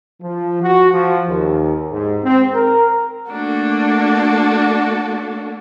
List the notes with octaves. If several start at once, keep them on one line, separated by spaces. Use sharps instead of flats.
F3
F#4
F3
D#2
G#2
C4
A#4
A3 A#3 D4 F#4 A4